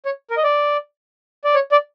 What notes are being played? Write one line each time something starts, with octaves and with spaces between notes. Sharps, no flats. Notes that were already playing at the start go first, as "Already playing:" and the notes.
C#5
A#4
D#5
D5
D5
C#5
D5